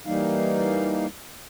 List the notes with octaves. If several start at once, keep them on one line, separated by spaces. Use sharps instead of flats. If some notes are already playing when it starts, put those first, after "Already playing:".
E3 G3 A#3 D#4 F5